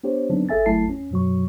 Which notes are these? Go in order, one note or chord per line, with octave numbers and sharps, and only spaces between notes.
B3 D4 G4 C5 C#5
D3 F#3 B3 C4 D4 D#4
G#1 G#4 A4 E5 G#5 A6
G1 F#3 A3 E4 A5 C7
E2 C#4
F#2 B2 F#3 F#4 C#6